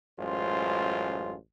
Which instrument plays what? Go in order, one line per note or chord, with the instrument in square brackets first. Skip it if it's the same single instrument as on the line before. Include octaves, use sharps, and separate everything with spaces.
[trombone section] A1 F#2 G#3 F4 C5